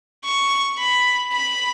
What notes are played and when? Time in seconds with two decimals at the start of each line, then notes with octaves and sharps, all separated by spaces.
0.25 C#6
0.78 B5
1.32 B5